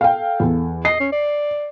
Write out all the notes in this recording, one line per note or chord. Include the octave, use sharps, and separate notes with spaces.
A4 F5 G5
E2
D#5 C7
C#4
D5